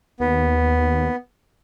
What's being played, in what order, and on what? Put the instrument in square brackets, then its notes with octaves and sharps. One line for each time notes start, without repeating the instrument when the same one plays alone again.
[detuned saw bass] D#2 [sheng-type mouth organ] B3